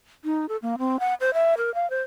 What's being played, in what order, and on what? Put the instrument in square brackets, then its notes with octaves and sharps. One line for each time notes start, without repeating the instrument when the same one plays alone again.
[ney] D#4
A4
A#3
C4
F#5
C5
E5
A#4
F5
C5